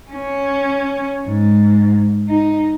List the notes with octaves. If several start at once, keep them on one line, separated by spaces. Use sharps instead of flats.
C#4
G#2
D#4